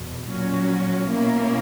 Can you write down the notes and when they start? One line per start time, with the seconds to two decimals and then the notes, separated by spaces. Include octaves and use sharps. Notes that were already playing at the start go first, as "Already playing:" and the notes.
Already playing: E2 B2
0.27 A#2 F#3 C#4 F#4
1.09 B2 A#3 C#4 E4 A#4